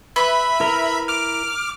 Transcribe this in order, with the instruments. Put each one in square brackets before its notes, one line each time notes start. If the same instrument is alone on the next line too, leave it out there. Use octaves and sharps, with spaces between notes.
[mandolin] B4 [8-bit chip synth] E5 B5
[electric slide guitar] E4 A#4
[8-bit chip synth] D6 F6